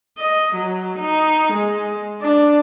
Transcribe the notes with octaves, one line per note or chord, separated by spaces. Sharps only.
D#5
F#3
D#4
G#3
D4